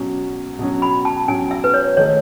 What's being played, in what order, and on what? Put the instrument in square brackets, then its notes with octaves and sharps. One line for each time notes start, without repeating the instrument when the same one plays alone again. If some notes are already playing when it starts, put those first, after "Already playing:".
Already playing: [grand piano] B2 F#3 C#4
B2 F#3 C#4
[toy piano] B5
A5
[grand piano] B2 F#3 C#4 [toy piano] G#5
[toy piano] E5
B4
C#5
[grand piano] D#3 A3 D#4 G#4 [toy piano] C#5